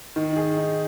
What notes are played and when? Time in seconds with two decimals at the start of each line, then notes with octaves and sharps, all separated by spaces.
0.16 D#3
0.36 G#4
0.57 D#4